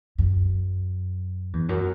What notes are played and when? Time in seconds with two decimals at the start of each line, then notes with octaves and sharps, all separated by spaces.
0.18 F#2
1.53 E2
1.69 F#2